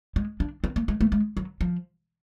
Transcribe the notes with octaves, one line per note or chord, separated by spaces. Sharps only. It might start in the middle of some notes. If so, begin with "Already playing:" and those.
G#3
D4
C4
A#3
G#3
A3
G#3
F#3
F3